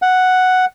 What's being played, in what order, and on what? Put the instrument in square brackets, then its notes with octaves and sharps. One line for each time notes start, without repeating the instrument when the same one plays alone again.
[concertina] F#5